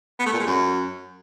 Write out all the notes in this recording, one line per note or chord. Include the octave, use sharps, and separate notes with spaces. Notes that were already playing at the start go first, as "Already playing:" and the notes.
B3
A3
A#2
G#3
F#2